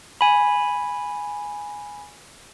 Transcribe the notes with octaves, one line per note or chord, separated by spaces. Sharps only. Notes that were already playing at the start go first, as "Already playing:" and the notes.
G#5 B5